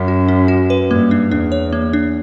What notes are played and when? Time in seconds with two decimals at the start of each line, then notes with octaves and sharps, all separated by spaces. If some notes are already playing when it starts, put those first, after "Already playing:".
Already playing: F#2 C#4
0.08 F#4
0.28 C#4
0.48 F#4
0.70 B4
0.91 G2 A#3
1.11 D4
1.31 E2 D4
1.52 C#5
1.73 A#3
1.93 D4